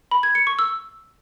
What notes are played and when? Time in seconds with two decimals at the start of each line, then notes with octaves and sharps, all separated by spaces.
0.11 B5
0.23 G#6
0.35 C#7
0.47 C#6
0.59 E6